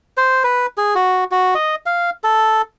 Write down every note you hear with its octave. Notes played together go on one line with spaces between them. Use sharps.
C5
B4
G#4
F#4
F#4
D#5
F5
A4